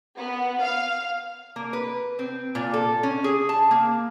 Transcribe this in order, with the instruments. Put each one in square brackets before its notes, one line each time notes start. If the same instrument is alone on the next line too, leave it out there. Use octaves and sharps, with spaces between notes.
[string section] B3
F5
[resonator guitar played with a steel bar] A#3
B4
C4
A#2
A4
C#4
G#4
A5
A#3